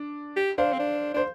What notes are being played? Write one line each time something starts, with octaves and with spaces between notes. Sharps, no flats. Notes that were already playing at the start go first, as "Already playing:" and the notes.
Already playing: D4
G4
D4 C5 F5
C4
D4
D4 C5